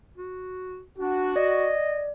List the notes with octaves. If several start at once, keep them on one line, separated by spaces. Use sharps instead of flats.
F#4
D4 F#4
D5 D#5